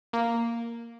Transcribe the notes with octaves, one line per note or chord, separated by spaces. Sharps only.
A#3